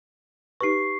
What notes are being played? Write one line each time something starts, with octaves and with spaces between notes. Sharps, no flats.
D#4 G4 B4 C#6 C7